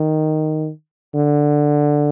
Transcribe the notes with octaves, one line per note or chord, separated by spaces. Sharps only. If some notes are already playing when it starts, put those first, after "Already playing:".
Already playing: D#3
D3